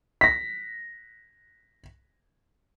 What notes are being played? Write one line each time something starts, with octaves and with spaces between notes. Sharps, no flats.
A#6 B6